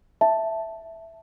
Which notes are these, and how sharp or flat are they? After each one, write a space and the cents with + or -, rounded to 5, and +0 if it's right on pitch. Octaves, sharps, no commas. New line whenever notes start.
E5 +0 A5 +0